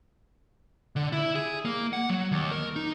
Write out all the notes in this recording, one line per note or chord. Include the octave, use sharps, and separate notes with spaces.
D3
E4
G#4
A#3
F#5
F#3
D#2
A#4
D#4